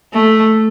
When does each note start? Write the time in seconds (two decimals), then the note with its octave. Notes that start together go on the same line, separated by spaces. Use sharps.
0.13 A3